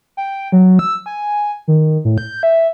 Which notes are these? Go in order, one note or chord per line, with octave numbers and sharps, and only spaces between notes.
G5
F#3
E6
G#5
D#3
A2
G6
E5